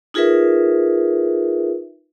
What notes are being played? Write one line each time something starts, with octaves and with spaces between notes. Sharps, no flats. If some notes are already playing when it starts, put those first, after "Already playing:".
D#4 F4 G#4 A#4 B4 E5